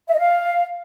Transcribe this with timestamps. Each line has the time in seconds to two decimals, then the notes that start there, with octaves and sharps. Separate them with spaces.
0.08 E5
0.14 D#5
0.19 F5